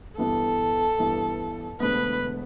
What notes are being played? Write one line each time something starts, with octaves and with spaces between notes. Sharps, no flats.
G2 E3 B3 A4
G2 E3 B3
E1 D2 D3 B3 B4